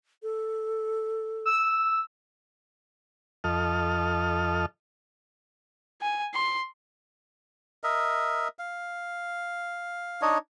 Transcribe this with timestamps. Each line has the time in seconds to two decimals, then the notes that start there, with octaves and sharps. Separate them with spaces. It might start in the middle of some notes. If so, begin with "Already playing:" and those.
0.23 A4
1.46 E6
3.44 F2 A4 D#5 F6
6.01 G#5
6.34 C6
7.84 A#4 D#5 E5
8.59 F5
10.22 D4 D#4 C#5 D#5